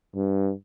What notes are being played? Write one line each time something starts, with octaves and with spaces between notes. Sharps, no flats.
G2